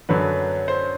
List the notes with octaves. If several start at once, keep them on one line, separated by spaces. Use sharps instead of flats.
F#2 D3 F#3 B4
C5